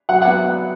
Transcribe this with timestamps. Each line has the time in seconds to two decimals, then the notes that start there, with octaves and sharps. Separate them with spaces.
0.09 F#3 F#5
0.22 F#5
0.27 B3